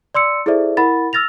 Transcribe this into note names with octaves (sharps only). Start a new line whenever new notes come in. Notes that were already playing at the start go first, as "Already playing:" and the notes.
D5 C6 E6 C#7
E4 G#4 A4 C5 D5 E5
E4 A#4 F#5 B5 A6
E6 F6 A6 A#6 F7